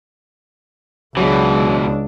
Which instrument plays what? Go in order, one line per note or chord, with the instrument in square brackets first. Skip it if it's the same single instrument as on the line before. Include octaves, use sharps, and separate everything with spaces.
[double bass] C#2 D4 [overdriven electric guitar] B2 E3 [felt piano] F#3 G#3